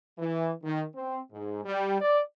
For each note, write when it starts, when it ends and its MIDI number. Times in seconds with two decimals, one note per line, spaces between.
0.18 0.51 52
0.64 0.83 51
0.95 1.20 60
1.32 1.65 44
1.65 1.96 55
2.01 2.20 74